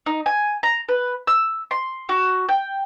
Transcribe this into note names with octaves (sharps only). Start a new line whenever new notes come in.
D#4
G#5
A#5
B4
E6
C6
F#4
G5